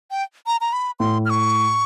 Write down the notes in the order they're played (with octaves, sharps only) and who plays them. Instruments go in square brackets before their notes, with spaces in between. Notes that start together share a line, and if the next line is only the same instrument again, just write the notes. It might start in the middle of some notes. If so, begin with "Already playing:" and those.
[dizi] G5
A#5
A#5
B5
[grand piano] A2 [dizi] C6
[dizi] F6
C#6